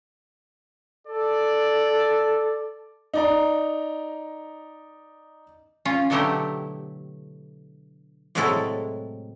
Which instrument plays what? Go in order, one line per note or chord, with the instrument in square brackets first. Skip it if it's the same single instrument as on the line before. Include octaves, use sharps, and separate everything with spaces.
[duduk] A4 [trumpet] D5
[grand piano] D#4 D5 A#5
[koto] C#4 F4
B2 D3 F#3 A3 E4 G4
A2 C3 F#3 G#3 E4 A4